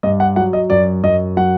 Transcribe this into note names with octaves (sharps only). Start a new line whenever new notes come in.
G2 D#5
F#5
F#3 F#5
D#5
F#2 D5
F#2 D#5
F#3 F#5